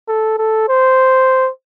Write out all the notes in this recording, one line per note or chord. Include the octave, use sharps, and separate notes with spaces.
A4
A4
C5